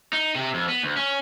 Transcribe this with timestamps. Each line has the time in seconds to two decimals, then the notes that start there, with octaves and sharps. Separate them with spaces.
0.13 D#4
0.35 C3
0.54 F2
0.68 B3
0.83 D2
0.97 C#4